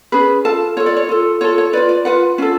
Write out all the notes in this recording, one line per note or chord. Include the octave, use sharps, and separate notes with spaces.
C#4 G#4 B4
F4 A4 A5
F4 A4 C#5
D5
C#5
F4 A4
F4 A4 C#5
C#5
F4 B4 D5
D5
F4 B4 F#5
C#4 F4 A4